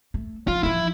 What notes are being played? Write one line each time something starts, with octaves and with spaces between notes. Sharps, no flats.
A3
F3 F4
E3 F3 E4